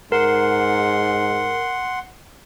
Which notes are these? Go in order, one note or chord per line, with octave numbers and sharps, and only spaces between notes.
G#2 A#4 F#5 C6